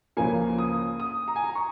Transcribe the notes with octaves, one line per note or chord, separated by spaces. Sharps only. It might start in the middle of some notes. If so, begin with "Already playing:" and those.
C#2 C#3 F3 A#3 G#5
D#6
D#6
A#5
G#5
A#5
C#6